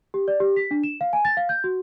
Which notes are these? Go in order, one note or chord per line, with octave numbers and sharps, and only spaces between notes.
G4
D5
G4
B6
D4
E7
F5
G#5
A6
F5
G6
F#4